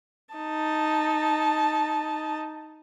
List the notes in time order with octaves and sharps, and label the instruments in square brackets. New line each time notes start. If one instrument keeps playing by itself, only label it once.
[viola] D#4 A5